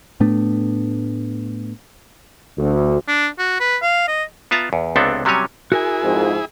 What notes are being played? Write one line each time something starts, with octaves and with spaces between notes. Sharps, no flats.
A2 A3 B3 D4
D2
D4
F#4
B4
F5
D#5
B3 F4 E5 A5 A#5
E2
C#2 C3 B3 C4 D4 A4
C3 F#3 G3 C#4 C#5 G#5
E4 F#4 G#4 A#4 G#5
F2 G#2